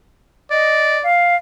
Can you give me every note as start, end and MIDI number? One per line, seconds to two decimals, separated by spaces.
0.51 1.09 74
0.51 0.99 75
1.03 1.36 77